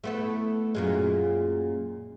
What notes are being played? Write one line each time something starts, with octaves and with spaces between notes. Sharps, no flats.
A3 B3 E4
F#2 A#2 G#3